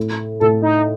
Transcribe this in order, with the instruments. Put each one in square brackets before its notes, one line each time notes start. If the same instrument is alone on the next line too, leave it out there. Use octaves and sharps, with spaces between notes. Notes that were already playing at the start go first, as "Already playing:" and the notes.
Already playing: [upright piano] A2
[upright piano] A2 [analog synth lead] A4
[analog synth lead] D#4